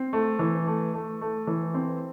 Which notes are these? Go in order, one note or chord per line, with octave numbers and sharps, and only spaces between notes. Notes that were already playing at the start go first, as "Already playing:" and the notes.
Already playing: C4
A3
E3
A3
A3
A3
E3
C4